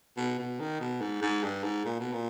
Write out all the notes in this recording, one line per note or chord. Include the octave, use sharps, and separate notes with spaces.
B2
B2
D#3
B2
G#2
G#2
G2
G#2
A#2
B2
A#2